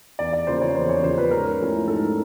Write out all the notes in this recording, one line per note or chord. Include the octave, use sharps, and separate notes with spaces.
E2 D5
D5
C#3 F3 A#3 C5
C#5
E2 C5
C#5
C#3 F3 A#3 C5
B4
G#2 A#4
F3 A3 C#4 E4
G#2 A4